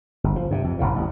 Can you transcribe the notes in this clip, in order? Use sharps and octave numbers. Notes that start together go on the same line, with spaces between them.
G1
F3
G2 C3
F2
F1 B1 A2 C#3
A1